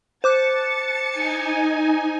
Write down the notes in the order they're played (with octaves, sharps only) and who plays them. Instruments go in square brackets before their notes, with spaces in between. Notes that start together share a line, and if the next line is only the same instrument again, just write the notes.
[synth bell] C5 D6 F#6 [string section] A5 A6 C#7
[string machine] D#4 G#5